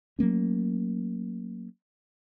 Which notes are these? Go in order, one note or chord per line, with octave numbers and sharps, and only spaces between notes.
F#3 A3 A#3 C#4